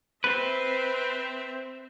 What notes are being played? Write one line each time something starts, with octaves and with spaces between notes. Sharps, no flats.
C4 B4 E5